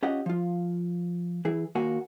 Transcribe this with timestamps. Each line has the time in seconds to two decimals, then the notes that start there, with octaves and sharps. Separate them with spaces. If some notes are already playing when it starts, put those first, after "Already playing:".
0.03 C#4 F4 G4 D#5 F#5
0.26 F3 F4
1.45 E3 E4 G#4
1.75 D#2 A#2 A#3 F#4 G#5